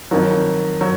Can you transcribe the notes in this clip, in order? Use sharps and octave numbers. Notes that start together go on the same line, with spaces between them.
F2 D#3 F#3
F#3